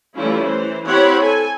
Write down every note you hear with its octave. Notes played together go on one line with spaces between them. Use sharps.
E3 G3 A3 C#4 E4 F4
E3 C5
C4 E4 G4 C#5 F#5 B5
A4 G#5